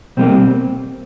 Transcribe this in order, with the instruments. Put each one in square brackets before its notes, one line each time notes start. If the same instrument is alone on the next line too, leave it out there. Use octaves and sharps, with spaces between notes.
[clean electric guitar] B2 G3 A#3 C4